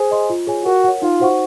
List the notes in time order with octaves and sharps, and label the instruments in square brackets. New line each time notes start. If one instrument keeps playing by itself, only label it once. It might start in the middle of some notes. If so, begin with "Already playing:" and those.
Already playing: [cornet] G#4 [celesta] C5
[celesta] D#5 G#5 C6
F4
G#4 C#5 G#5
[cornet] F#4 [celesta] A#4
[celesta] C#5 F#5
[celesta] D#4 [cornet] F4
[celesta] F#4 C5 F#5 C#6